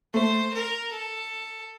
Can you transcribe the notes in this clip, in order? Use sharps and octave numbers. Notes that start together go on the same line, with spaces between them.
A3 C5
A#4
A4